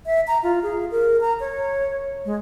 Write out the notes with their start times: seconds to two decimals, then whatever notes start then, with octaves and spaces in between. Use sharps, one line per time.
0.06 E5
0.27 A#5
0.43 F4
0.63 G#4
0.91 A#4
1.21 A#5
1.40 C#5
2.25 G#3